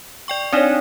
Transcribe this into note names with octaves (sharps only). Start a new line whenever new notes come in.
D5 G5 C#6
C4 D4 D#4 C#5 D5